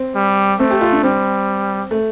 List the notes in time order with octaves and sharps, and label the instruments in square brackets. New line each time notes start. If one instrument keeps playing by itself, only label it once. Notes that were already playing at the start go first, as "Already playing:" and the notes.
Already playing: [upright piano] C4
[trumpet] G3
[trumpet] A3 [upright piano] C4
[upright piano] G4
F4
D4
[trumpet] G3 [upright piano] C4
[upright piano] A3